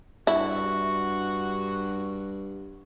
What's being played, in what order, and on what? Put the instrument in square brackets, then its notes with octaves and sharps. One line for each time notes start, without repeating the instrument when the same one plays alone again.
[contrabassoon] G2 [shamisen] E4 [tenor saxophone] F#4